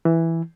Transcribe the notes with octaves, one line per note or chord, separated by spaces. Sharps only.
E3